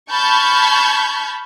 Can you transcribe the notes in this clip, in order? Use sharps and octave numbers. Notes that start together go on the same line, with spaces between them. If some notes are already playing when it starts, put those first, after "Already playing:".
A5 B5 C#6 F6 G6 G#6